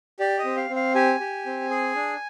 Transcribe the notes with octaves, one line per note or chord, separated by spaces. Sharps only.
G4 D5
D#5
C4
F5
C4
F5
G4 G#5
G4
C4
G#4
D4